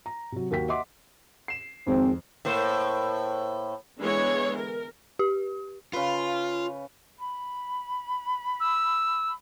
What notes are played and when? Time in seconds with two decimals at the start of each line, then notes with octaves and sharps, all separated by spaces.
0.06 A#5
0.32 C3 F#3
0.51 D#2 A#3 F#4 G5 B6
0.69 D#5 E5 F#5 C6 D6
1.48 C7 E7
1.87 G#1 F2 C4
2.45 A2 A#3 C5
3.98 D3 E3 G#3 B3 C#5
4.55 A#4
5.19 G4
5.93 C#3 F4 B4
7.19 B5
8.60 E6